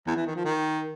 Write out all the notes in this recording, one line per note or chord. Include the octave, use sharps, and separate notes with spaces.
E2
E3
D#3
F3
D#3